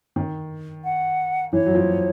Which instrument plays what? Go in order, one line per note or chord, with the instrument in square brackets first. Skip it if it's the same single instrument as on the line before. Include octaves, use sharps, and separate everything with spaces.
[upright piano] D#3
[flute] F#5
[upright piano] E3 [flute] C#5
[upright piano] F#3
F3